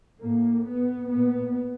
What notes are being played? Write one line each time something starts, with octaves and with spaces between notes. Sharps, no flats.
A2 A#3
B3
A#2 B3